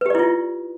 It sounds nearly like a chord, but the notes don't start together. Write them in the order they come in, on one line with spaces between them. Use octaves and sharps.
B4 G4 D5 E4 F4